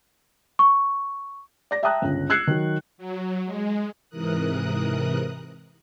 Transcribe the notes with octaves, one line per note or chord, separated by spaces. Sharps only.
C#6
D5 A#6
E5 G5 A5 A#5 D#6 F#6
G1 C#2
E6 F#6 G#6 C7 C#7
D#3 F#3
F#3
G#3
G#2 C3 E3 A#4 D#6 F#6